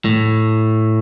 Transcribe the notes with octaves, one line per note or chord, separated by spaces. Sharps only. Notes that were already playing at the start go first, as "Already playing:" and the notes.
A2